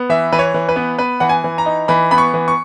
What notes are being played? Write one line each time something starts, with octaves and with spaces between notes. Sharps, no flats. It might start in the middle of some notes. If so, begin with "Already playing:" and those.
Already playing: B3
E3 E5
E3 B4
C#5
E3
B4
B3
B3 B4
E3 F#5
G#5
E3
A#5
D#4
E3 B5
B3 B5
C#6
E3
C#6